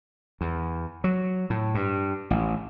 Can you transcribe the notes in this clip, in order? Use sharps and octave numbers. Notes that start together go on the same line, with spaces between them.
E2
F#3
A2
G2
A1